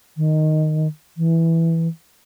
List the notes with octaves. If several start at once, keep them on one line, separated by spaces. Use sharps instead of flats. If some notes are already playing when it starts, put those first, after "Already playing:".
D#3
E3